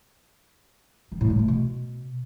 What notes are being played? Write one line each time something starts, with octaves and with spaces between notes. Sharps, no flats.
D#3
A2
G3
A3
B2